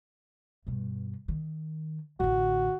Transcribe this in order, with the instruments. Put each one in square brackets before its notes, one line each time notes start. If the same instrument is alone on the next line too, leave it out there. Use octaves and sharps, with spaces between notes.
[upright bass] G2 B2
D#3
[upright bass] A1 D3 [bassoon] F#4